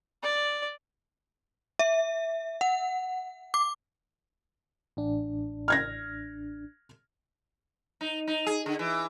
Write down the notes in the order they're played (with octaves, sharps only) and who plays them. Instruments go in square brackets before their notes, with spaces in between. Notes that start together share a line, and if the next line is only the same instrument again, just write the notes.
[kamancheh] D5
[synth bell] E5
F#5
D6
[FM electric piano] A1 D4
[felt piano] F6 G#6 A#6
[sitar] D#4
D#4
G#4
D3
E3